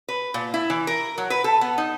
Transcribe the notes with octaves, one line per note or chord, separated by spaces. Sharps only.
B4
A#2
E4
E3
A#4
F#3
B4
A4
B3
D#4